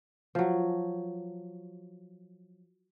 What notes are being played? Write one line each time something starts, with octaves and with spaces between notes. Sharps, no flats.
F3 F#3